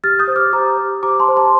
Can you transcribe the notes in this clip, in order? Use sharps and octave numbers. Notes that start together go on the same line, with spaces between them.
G4 F6 A6
D#6 G6
C5
D6 F6
G4 A#5 D6
C5
G4 A#5 D6
A5 C6
C5
A5 C6